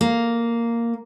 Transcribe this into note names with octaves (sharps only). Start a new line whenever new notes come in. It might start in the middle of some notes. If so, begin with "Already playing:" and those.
A#3